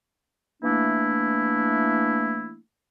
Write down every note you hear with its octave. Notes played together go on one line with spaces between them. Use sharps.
E3 A3 A#3 D4 E4